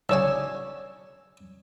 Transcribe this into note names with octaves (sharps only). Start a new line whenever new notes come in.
B1 C#3 C#5 D5 G#5 E6